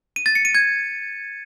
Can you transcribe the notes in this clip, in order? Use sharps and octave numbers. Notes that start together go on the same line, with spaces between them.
D#7
A6
C#7
D#7
G#6